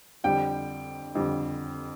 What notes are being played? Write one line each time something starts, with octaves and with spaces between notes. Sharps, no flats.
F2 D3 G3 G5
F2 D3 G3